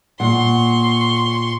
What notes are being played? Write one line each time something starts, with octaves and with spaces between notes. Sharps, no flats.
A#2 F#5 C6 C#6